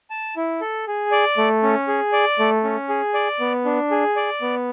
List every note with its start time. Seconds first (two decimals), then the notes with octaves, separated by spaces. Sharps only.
0.10 A5
0.36 E4
0.61 A4
0.87 G#4
1.11 D5
1.37 A3
1.63 C#4
1.88 G#4
2.13 D5
2.39 A3
2.64 C#4
2.89 G#4
3.14 D5
3.40 B3
3.65 D4
3.91 G#4
4.16 D5
4.42 B3